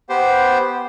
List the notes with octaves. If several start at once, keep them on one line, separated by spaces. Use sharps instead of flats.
B3 G4 C5